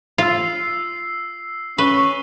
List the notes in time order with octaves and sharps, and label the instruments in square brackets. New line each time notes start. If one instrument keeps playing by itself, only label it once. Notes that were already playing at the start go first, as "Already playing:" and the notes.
[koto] F4 [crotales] E6 C7
[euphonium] C#4 [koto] B4 [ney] C#6 [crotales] D#7 F7 G7